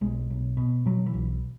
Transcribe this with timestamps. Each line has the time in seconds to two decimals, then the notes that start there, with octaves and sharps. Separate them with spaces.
0.01 B1 G#3
0.30 B1
0.57 B2
0.86 B2 F#3
1.06 E3
1.14 B1